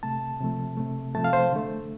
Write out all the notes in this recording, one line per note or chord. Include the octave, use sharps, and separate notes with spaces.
C3 A3 A5
C3 F3 A3
C3 A3
C3 F3 A3 A5
F5
C5
D3 A3